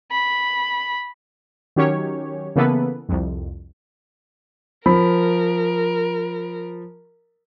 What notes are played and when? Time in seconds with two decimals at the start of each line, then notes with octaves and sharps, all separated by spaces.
0.11 B5
1.76 D#3 F#3 C#4 G4 C#5
2.56 C#3 E3 A#3 B3 A4 B4
3.09 C2 F2
4.86 F3 A#4 B5